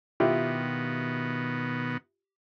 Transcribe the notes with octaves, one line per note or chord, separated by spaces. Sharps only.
B2 D#3 B3 E4 F4 G4